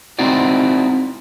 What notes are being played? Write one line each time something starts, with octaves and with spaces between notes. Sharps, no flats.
C4 D#4 E4 F#4 D5